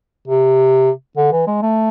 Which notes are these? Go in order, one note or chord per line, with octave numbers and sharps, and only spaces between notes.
C3
D3
E3
G#3
A3